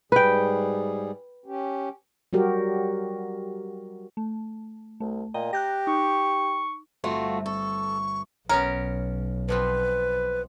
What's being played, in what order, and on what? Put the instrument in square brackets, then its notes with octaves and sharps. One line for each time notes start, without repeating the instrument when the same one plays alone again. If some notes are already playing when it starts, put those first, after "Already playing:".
[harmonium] G#2 G3 G#4 [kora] B4 G5
[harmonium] C#4 G4
[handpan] F#3 G3 F#4 G4 A#4
[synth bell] A3
[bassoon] C2 [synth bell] A3
[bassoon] A#2 [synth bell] D#5 G5 A#5
[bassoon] G4 [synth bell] F#6 G6 A#6
[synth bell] D#4 [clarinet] C#6
[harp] G1 C4 [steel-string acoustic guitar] A3 F4 F#4
[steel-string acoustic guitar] A4 [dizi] C#6
[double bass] B1 [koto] B3 C#4 C#5 [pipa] A#4
[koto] B2 F3 C4 [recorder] B4